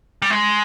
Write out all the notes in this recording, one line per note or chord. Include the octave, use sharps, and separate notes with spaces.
G3
G#3